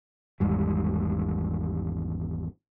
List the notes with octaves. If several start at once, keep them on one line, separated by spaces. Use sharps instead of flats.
G#1 E2 G#2 G3